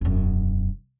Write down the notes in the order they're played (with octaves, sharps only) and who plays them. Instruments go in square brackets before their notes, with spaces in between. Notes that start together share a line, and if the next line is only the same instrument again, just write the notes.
[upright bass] E1 F#2